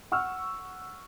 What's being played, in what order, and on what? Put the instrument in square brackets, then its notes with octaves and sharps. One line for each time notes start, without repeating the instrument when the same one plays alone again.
[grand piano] F#5 C#6 E6 F6